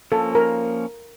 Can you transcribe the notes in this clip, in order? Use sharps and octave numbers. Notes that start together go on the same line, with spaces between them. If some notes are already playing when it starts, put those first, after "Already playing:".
F3 A#3 C#4 A4
A#4